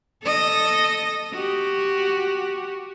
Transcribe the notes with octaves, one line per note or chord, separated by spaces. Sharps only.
A4 D#5
F#4 G4